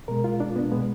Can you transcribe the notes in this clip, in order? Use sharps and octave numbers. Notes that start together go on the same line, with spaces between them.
B2 G#3 A#4
F4
D4
B3
B2 G#3 B3